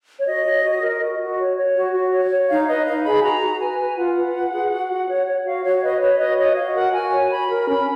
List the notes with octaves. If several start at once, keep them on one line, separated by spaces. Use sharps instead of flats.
C#5
F#4 D#5
C#5
F#4
A#4
F#4
F#4
C#5
C#5
F#4
F#4
C#5
C#5
D#4 F5
B4 D#5
D#4 F5
G#4 B5
F#4 A#5
F#4
B4 G#5
B4
F4 F#5
B4
F4
G#4
F#4
F#4
C#5
C#5
F#4 F5
F#4 C#5
B4 D#5
B4 C#5
F#4 D#5
C#5 D#5
F#4 F5
A#4 F#5
F#4 G#5
C#5
F#4 B5
A#4
C#4 B5